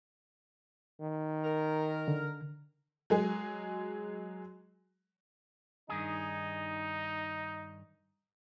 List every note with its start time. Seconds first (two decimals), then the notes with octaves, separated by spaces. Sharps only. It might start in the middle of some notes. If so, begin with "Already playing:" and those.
1.01 D#3
1.45 A#4
2.08 D3
3.10 F#3 G#3 G#4
5.89 G2 D#3 D#4 G#4